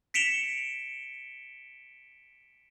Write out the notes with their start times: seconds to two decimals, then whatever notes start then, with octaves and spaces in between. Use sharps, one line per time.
0.14 B6 C#7 D7 E7 F7 G7